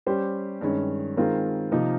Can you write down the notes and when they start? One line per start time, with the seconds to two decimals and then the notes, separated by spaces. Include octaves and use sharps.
0.06 G3 C#4 G4 C5
0.61 G2 D#3 G#3 C#4
1.17 D#3 G#3 C4 F4 A#4
1.72 C3 F3 A#3 D#4 A#4